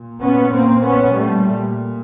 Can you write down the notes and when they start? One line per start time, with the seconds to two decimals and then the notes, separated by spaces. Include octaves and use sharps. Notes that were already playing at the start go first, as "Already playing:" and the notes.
Already playing: A#2
0.21 B3 C#4
0.53 A#3 C4
0.84 B3 C#4
1.16 A#2 G3 A3